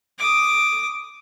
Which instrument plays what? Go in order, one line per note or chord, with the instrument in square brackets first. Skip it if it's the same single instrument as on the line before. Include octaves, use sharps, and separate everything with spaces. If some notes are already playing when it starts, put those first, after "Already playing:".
[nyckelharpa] D6 D#6